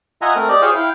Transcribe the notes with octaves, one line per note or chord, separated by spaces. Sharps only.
F4 D#5 E5 F#5 G#5 A#5
A3 C4 A#4
G4 D5 D#5
F4 G#4 C5 C#5 F5 G5
E4 F5 G5